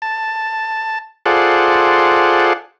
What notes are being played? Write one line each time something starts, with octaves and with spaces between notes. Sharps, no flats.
A5
F4 G#4 A4 C5 D5 F#5